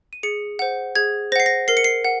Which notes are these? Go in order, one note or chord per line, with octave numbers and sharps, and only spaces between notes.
D#7
G#4 C#7
C5 F#5
G#4 G#6
C5 F#5 A#6 C7
A#6
A#4 C7
C#7
C7
F#5